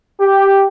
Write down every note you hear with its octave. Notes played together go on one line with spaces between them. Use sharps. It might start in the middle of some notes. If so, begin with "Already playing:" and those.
G4